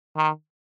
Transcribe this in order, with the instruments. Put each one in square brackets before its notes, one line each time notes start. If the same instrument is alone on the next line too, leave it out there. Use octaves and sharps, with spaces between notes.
[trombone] D#3